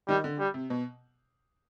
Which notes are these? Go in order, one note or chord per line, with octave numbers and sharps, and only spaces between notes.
D#3 G3
D3
G3
C3
B2